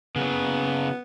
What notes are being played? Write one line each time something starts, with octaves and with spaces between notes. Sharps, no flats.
C#3 F#3 B3